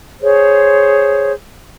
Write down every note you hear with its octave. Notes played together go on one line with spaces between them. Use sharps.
G#4 C5 C#5